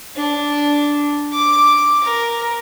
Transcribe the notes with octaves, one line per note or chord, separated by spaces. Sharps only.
D4
D6
A#4